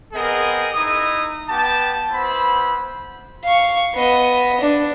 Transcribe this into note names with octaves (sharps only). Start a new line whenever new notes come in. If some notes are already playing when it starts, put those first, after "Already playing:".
B3 C4 G#4 A#4 D#5
D#4 E4 D#6
B3 G4 A5
B3 E4 C5 B5
F5 C#6
B3 D#5
D4